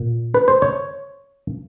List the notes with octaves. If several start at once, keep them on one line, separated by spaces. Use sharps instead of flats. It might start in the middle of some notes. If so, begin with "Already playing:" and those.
Already playing: A#2
B4
C5
C#5